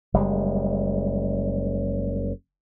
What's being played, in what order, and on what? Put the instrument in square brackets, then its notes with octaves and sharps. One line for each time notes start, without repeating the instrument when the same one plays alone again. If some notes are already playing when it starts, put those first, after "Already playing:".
[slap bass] F#1 G3 G#3